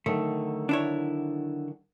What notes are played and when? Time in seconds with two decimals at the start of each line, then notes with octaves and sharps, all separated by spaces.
0.06 D3 D#3 F#3 A3
0.69 D4 E4 C#5